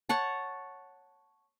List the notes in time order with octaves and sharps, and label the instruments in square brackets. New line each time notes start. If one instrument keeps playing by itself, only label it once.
[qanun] C#5 F#5 A5